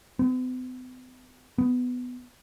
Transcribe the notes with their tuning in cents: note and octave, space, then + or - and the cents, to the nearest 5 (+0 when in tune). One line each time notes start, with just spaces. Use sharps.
B3 +45
B3 +10